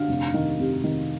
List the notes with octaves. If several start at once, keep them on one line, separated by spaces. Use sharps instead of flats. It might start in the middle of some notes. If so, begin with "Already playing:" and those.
Already playing: D3 F5
F1
D#3
C3
D#3